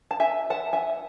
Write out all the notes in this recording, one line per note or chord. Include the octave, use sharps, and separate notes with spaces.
A5
E5 G#5
F#5 A5
E5 G#5
E5